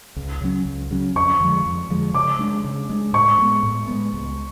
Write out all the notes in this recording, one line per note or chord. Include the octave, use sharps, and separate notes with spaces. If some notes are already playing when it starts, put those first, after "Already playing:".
C#2
C#3 F#3 C#4
C#2
C#3 F#3 C#4
F2 C#6
D3 F3 G#3
F2
D3 F3 G#3
C#3 D6
G#3 D4
C#3
G#3 D4
A2 C#6
G#3 B3
A2
G#3 B3
C#2